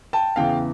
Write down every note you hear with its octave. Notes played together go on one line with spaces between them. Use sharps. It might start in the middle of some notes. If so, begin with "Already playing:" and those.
G5 A5
E2 C#3 E3 F5 G5